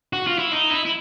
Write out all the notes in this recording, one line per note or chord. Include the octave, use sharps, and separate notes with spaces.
F#4
F4
E4
D#4
E4
E4